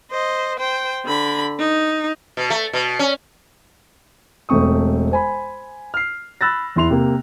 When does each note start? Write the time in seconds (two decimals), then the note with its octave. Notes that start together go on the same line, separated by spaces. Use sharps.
0.11 C5 D#5
0.59 C5 G5
1.05 D3 B5
1.59 D#4
2.37 B2
2.50 A3
2.73 B2
2.99 C#4
4.49 E1 A3 C4 C#6 D#6
5.11 C5 G#5 B5
5.94 F6 C7
6.41 B5 E6 F#6 A6 A#6
6.76 E2 E4 C6 F7
6.90 C3 A#3